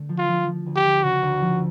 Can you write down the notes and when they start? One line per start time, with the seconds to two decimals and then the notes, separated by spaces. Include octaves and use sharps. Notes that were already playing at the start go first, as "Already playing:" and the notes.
Already playing: D3 A3
0.09 F3
0.18 F4
0.28 F3
0.47 F3
0.66 D2
0.76 G4
0.85 D2
1.03 C#3 F#4
1.22 D2
1.42 F3